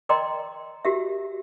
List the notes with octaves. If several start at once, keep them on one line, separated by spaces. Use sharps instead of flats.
A#4 D5 D#5 G5 A#5 C6
F#4 G4 A#4 E5